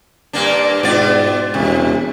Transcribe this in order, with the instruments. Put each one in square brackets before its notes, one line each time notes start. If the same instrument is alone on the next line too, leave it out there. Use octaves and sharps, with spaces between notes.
[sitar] G2 A#3 D4
[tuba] G#2 [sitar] B2 F4 D5
[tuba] E1 [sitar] C3